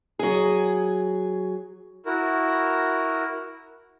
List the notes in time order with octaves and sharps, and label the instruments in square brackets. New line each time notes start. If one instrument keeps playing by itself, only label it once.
[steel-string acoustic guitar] F#3 G#4
[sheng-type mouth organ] E4 F#4 A#4